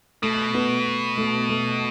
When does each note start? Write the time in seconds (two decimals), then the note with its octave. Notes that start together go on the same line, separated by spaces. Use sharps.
0.22 B2 A3
0.54 B3
1.17 A3
1.49 A3